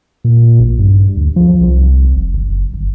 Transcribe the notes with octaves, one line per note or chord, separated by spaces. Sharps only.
A#2
A1
G2
D2
F3
C2
F1
F#1
G1